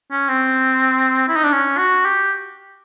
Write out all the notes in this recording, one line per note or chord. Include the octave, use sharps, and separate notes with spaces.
C#4
C4
E4
D#4
D4
C#4
F#4
G4